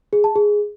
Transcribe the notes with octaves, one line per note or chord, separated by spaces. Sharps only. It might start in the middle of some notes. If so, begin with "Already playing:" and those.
G#4
A5
G#4